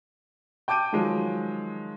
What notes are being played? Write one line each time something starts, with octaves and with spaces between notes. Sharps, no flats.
G5 A5 D6 G6 D7 D#7
D#3 F3 F#3 G#3